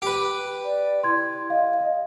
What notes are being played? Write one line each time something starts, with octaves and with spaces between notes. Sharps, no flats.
G4 B4
D5
E4 C6 G#6
D#5 F5